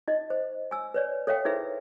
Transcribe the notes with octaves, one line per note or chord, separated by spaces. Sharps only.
D#4 D#5
C5
G#5 E6
B4 C#5 D5
A4 C#5 E5 F5 G5
D#4 E4 G#4 B4 C5 E5